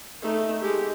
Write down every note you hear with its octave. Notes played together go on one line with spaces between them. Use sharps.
A3 D#4
G#3 G4